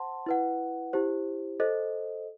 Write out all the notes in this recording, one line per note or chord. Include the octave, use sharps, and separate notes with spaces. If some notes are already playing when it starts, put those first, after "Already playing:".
Already playing: C5 F#5 A5 C6
E4 B4 F#5
E4 G4 C5
A4 C5 D#5